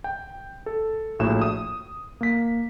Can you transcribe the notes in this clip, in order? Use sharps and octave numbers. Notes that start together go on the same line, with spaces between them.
G5
A4
A#1 A2 F#4 E7
D#6
A#3 B6